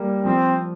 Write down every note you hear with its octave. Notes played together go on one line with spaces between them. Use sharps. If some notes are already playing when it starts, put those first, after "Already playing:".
Already playing: G3 A#3
F3 C4